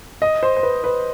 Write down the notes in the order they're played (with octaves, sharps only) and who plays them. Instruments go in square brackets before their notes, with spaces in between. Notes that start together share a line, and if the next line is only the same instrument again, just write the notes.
[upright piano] D#5
C5
C5
B4
B4